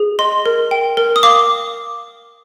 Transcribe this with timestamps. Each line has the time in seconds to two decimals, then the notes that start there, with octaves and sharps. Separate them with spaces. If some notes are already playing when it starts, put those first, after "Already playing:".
Already playing: G#4
0.19 D#5 C6
0.46 A#4
0.71 G5
0.97 A#4
1.16 D#6
1.23 F5 D6